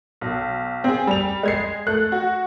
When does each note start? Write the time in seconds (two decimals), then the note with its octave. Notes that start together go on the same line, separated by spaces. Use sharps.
0.21 B1
0.84 C4 G#4
1.07 G3 F7
1.43 G#3 G#6 C7
1.87 A3 F#6
2.12 F#4